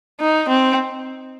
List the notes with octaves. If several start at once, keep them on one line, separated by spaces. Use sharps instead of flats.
D#4
C4